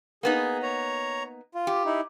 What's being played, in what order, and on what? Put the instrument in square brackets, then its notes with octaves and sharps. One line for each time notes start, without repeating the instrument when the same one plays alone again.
[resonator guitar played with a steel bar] A#3 B3 D#4 [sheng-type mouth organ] G#4
[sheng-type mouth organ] C#5 A#5
F4
[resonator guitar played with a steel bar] G4
[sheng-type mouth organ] D#4 E4